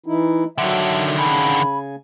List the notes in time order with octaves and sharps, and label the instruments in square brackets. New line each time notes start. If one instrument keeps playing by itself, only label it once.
[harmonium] E3 D#4 E4
[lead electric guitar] D3 D#3 [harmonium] F#3 E5
[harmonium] C#3 G#5 [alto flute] B5